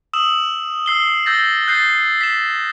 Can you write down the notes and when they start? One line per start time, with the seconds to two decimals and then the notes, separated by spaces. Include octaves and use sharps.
0.13 D#6 E6 E7 F#7
0.86 E6 C7 G7
1.26 E6 G6 A6 A#6
1.67 F#6 G6 A6 C7 G7
2.21 B6 E7